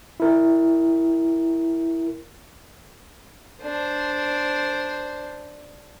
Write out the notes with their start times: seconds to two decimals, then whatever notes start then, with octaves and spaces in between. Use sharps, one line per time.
0.20 E4 A#4
3.62 D4 C5